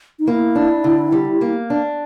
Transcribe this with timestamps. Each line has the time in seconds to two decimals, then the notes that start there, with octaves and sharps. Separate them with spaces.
0.19 D#4
0.27 A#3 E4
0.55 D4
0.84 D3
1.12 G3
1.41 A#3
1.70 D4